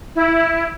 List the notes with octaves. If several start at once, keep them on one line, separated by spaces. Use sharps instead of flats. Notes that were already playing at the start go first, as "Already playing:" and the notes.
E4